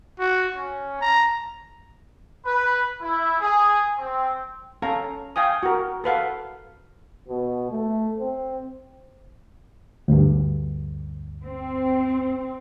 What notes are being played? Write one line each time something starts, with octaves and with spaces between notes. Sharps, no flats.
F#4
C#4
A#5
B4
E4
G#4
C4
C#4 A4 F5 A#5
F5 G5 G#5 D#6
F#4 A#4
A4 B4 F5 F#5
B2
A3
C4
D2 G2
C4